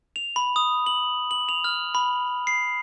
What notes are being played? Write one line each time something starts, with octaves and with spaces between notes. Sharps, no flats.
F7
B5
D#6
F#7
F#7
F7
F6
B5
C7